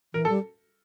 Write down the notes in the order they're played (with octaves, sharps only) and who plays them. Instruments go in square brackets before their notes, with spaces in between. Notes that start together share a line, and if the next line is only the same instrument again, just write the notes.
[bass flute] E3 [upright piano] A#4
[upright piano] A4
[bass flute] G3